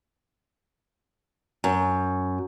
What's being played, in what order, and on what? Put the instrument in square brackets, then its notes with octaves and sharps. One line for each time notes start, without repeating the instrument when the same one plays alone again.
[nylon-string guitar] F#2